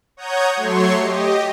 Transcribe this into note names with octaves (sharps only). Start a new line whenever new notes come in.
C#5 F#5 A#5 D#6 G6 G#6
F#3 A3 C#5 C6 C#6
G4 D#5